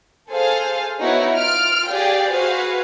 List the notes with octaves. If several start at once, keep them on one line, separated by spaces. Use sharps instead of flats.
G#4 A4 C5 F5
B3 D#4 E4 F#4 C#5
F4 F6 D7
G4 G#4 D5 F5 G5
F#4 G#4 B4 C5 F5